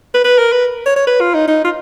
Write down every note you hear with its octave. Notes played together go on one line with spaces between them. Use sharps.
B4
B4
A#4
B4
C#5
C#5
B4
F4
D#4
D#4
F4